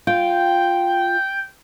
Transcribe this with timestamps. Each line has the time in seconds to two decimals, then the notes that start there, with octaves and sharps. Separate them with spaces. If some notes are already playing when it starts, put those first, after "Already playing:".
0.07 F4 G5